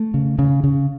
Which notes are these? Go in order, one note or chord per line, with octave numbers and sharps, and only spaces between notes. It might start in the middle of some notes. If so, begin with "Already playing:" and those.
Already playing: A3
C#3
C#3
C#3